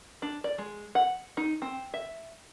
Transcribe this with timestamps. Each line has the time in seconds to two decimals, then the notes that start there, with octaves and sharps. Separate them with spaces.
0.22 D4
0.44 D5
0.58 G#3
0.95 F#5
1.37 D#4
1.62 C4
1.94 E5